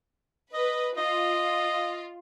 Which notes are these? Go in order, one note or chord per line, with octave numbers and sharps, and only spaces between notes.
B4 D#5
F4 D#5